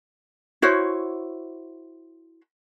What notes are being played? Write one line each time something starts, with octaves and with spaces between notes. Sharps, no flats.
E4 F#4 C5 C#5